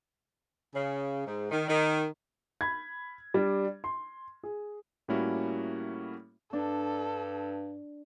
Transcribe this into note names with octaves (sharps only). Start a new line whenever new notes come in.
C#3
G#2
D#3
D#3
B5 G#6
G3 D4
C6
G#4
A2 G3 A#3 C#4 E4 F#4
G2 D4 A4